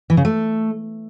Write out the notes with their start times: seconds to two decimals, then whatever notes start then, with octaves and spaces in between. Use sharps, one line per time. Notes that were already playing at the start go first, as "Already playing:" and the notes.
0.10 E3
0.17 C#3
0.25 A3